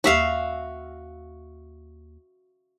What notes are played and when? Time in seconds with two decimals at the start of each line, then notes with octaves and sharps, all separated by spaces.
0.04 D#2 F#4 E5 F5